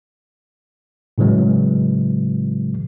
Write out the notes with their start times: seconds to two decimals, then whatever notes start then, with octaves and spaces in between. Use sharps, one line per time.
1.18 A2 C#3 E3 F#3 G#3